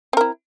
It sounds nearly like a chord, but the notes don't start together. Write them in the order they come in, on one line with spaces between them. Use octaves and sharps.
C4 A#4 E4